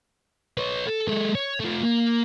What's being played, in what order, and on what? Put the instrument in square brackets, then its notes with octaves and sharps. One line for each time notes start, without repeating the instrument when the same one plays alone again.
[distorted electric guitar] B4 C#5
A4
G#3 A4
C#5
A3 F4
A#3